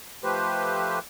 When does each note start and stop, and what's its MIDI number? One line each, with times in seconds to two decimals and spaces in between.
0.23 0.99 53
0.23 0.99 57
0.23 0.99 67
0.23 0.99 71
0.23 0.99 72